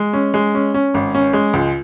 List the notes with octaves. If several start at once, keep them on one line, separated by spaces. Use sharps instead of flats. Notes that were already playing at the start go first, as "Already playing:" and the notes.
Already playing: G#3
C#4
G#3
C#4
C#4
G#1
C#4
G#3
C#2